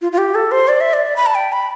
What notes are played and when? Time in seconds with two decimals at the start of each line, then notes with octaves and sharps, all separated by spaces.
0.02 F4
0.12 F4
0.18 G4
0.35 A4
0.52 C5
0.68 D5
0.81 E5
0.93 D5
1.16 B5
1.26 A5
1.35 G5
1.52 B5